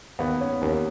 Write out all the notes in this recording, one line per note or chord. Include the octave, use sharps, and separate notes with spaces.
D#2 B3
C#4
D#2 C#4